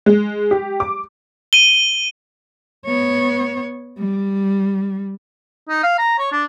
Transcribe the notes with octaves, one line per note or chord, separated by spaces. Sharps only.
G#3
G4
D6
D#7 G7
B3 C#5
G3
D#4
F5
A#5
C#5
D4